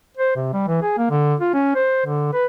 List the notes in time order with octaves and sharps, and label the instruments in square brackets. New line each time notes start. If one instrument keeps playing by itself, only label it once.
[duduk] C5
C3
G3
E3
G#4
A#3
D3
F4
C#4
C5
D3
B4